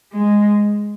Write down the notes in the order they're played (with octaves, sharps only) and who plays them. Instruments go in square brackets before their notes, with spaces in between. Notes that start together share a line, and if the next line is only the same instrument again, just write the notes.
[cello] G#3